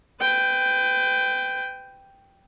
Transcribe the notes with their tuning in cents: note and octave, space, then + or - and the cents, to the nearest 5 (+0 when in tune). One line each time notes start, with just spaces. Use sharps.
B4 +35 G5 +0